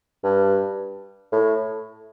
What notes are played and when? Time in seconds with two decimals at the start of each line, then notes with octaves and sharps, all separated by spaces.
0.24 G2
1.32 A2